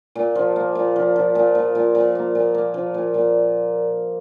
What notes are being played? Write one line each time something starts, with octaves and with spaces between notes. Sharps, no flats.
A#2
F3
A#3
A#2
F3
F3
A#2
A#2
A#2
A#2
A#3
A#2
A#3
F3
A#2
A#2